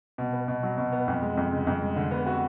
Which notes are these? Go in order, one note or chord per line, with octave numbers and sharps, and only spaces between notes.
B2
B3
B2
F#3
B2
B3
F2
G#3
F2
C#3
F2
G#3
D3
B3
F#4